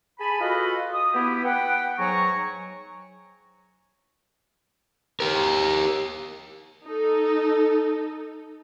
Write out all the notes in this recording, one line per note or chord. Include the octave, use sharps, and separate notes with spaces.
G#4 G#5 A5 B5
F4 F#4 A4 B4 D#5
D#6
B3 E4 G4
B4 F#5 G5
G#2 F#3 G#5 A#5 C#6
G4 A#4
D#4 A4